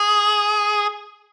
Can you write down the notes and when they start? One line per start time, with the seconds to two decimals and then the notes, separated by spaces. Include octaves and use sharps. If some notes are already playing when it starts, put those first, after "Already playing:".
Already playing: G#4